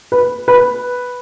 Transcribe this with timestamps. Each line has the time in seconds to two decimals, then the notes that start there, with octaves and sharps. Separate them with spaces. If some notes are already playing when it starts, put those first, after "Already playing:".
0.12 B4
0.48 B4